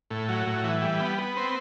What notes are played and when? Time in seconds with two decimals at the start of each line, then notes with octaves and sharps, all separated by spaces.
0.10 A2
0.29 F#3
0.47 A2
0.64 E3
0.82 G3
1.00 B3
1.18 B3
1.37 C4